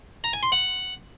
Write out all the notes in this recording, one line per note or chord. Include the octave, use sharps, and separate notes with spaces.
A#5
G#5
C6
F#5